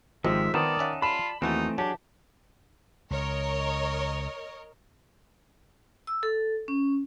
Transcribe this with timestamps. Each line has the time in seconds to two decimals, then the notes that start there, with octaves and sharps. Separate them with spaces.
0.24 G#1 D#3 F3 G#3 G4 D#5 E5
0.54 D#3 B3 D#4 C5 D5 E5 A5 D#6
0.79 C#4 E5 F#5
1.02 F4 D5 A5 B5
1.42 D#2 E3 A3 C4 D#4 F#4 A5
1.78 F#3 D4 G4 G#4 A5
3.11 C#2 A#4 C#5 D#5
6.07 E6
6.23 A4
6.68 C#4